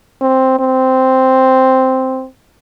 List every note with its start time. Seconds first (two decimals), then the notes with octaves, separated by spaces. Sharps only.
0.21 C4
0.59 C4